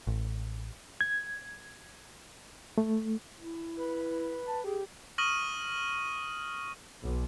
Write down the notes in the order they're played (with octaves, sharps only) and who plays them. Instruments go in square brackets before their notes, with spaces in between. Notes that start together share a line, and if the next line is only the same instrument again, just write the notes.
[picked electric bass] A1
[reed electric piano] G#6
A3
[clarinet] E4
[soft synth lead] B4
[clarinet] A5
[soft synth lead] G4 [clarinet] G#4
[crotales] C#6 D#6 F6 A#6 D#7 F#7
[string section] B1